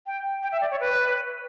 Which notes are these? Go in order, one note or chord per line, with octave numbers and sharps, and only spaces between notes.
G5
G5
E5
D5
C#5
B4